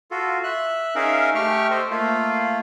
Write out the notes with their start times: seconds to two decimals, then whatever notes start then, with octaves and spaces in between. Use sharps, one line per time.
0.11 F4 F#4 A4
0.44 E5 F#6
0.95 C#4 D#4 G#4 A#4 E5 F5
1.35 A3 G4 G5 C#6 F6
1.71 A4 C5 D#5
1.90 A3 A#3 F4